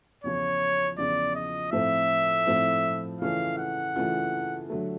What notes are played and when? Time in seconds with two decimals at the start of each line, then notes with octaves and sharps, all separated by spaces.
0.24 E2 C#3 F3 C#5
0.98 E2 C#3 F3 D5
1.35 D#5
1.72 A2 F3 A3 C4 E5
2.47 A2 F3 A3 C4
3.21 C#3 E3 A3 C#4 F4 F5
3.58 F#5
3.96 C#3 E3 A3 C#4 F4
4.70 D3 F#3 A3